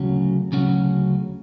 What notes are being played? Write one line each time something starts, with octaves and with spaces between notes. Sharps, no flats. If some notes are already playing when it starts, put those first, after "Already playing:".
Already playing: D2 C#3 F#3 C#4 F#4
D2 C#3 F#3 C#4 F#4